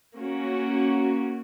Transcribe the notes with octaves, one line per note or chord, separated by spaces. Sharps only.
A#3 C#4 F#4